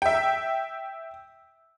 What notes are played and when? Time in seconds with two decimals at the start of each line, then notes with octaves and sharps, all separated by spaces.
0.02 E5 G5